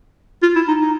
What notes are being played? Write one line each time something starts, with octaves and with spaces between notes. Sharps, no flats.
F4
E4
D#4
D#4